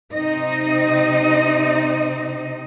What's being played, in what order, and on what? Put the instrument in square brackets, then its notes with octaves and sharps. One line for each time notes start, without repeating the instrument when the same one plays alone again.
[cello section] C3 C4 D#4 D#5